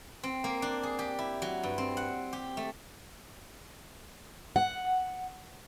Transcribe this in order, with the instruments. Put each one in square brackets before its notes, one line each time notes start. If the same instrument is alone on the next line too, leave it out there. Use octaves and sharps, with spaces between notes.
[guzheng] C4
A#3
D4
G#4
G4
E4
F#3
G2
C4
F#5
G4
A3
[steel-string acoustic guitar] F#5